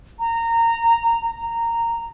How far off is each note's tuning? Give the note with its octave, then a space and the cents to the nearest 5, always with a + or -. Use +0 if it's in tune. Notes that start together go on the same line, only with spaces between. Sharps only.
A#5 -20
A#5 -10